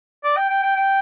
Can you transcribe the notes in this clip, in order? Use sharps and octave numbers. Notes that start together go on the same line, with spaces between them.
D5
G5
G5
G5
G5